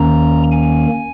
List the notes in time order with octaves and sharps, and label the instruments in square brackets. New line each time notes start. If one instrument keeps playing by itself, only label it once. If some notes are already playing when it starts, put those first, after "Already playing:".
Already playing: [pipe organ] D#2 D#3 A#3 C#4 A#5
G#5